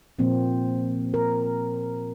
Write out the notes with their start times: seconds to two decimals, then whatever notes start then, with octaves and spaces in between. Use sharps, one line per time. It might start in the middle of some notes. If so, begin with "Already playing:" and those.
0.19 A#2 F3 A#3 C4
1.14 A#4